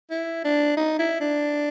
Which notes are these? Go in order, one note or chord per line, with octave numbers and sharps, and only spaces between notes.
E4
D4
D#4
E4
D4